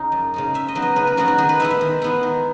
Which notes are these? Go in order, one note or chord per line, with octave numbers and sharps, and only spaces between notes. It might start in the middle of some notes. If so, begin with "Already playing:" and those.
Already playing: C#3 D#4
F#2
C#3 G#3 D#4
C#3 E5
D#5
F#3 B3 D#4
D#5
C#3 B4
A#4
F#3 B3 D#4 F#4
F#4
D#3 G#4
B4
G#3 B3 E4 E5
E5
D#3
G#3 B3 E4
D#3